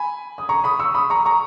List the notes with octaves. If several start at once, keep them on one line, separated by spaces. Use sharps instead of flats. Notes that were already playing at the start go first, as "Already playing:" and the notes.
Already playing: G#5 B5
D#6
A#5 C#6
B5 D#6
C#6 E6
B5 D#6
A#5 C#6
A#5 C#6